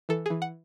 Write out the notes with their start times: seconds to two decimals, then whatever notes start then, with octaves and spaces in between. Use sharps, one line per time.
0.09 E3 A4
0.26 E3 G#4
0.42 F#5